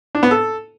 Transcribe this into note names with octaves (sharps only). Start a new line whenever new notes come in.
D4
B3
A4